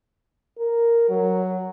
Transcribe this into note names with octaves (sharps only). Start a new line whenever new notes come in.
A#4
F#3